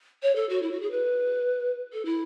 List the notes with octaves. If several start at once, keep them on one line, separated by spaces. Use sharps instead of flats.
C#5
A4
F#4
E4
F#4
G#4
B4
A4
E4